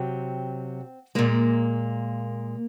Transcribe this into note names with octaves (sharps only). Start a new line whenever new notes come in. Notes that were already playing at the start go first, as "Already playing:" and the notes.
Already playing: C3 F#3 C4
A#2 G#3 A#3